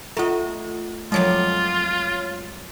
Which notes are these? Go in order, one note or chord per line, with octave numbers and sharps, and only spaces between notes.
A3 F4 A4 D#5
F2 F#3 G#3 F4 C#5 D#5